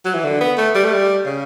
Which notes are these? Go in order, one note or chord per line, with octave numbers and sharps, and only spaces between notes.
F#3
E3
D3
B3
A3
G3
A3
G3
C#3